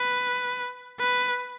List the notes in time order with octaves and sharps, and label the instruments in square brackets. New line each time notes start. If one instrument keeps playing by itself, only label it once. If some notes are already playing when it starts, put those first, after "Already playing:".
Already playing: [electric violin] B4
B4